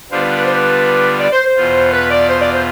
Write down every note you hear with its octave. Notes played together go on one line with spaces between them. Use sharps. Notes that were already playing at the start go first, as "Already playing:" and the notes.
D3 G3 B3 D4 F4 C5
B4
B4
C5
B4
D5
C5
C5
E2 B2 B3 F4
B4
D5
C5
D5
C5